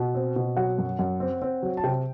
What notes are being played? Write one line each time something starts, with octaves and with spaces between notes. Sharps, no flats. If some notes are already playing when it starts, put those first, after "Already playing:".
Already playing: B2
C4
B2
F#3 F#5
F#2
F#2
C4
C4
F#3
A5
C3 G5